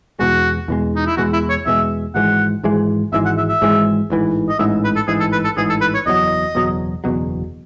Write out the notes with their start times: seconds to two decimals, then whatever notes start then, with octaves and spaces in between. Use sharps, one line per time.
0.19 E2 B2 G#3 F#4
0.68 E2 B2 G#3
0.95 D#4
1.06 E4
1.17 E2 B2 G#3 F#4
1.33 E4
1.50 C#5
1.66 E2 B2 G#3 E5
2.15 G#1 G#2 E3 G#3 F#5
2.63 G#1 G#2 E3 G#3
3.13 G#1 G#2 E3 G#3 E5
3.25 F#5
3.37 E5
3.49 E5
3.61 G#1 G#2 E3 G#3
4.10 A1 G#2 E3
4.49 D#5
4.59 A1 G#2 E3 E5
4.84 B4
4.96 A4
5.08 A1 G#2 E3 G#4
5.20 A4
5.32 B4
5.44 A4
5.57 A1 G#2 E3 G#4
5.69 A4
5.81 B4
5.94 C#5
6.06 F#1 E2 B2 F#3 D#5
6.55 F#1 E2 B2 F#3
7.04 F#1 E2 B2 F#3